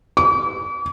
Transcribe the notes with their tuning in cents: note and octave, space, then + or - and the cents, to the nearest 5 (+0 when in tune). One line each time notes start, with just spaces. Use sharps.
D6 -45